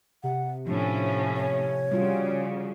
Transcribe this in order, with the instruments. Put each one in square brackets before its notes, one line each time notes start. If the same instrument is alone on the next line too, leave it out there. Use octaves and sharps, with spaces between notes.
[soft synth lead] C3 [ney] F#5
[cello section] A2 C#4 [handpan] F3 [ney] D4
[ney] C#5
[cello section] C#3 [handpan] G3 F4 F#4